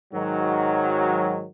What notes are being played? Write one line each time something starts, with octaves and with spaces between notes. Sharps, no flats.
G#2 D#3 F#3